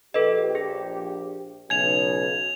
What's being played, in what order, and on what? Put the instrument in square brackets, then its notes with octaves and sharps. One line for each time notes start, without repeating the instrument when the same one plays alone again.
[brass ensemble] A#1 G4 [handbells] A4 B4 D#5
[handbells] G#4
[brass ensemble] B1 C#3 [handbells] G#5 [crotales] G#6 F7